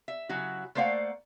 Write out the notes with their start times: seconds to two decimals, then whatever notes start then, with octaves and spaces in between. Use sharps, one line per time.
0.08 E5
0.29 C#3 F#3 E4 F#4
0.75 A3 A#3 C5 D5 F5 F#5